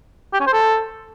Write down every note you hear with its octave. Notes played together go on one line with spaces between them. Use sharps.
G4
C#4
C5
A4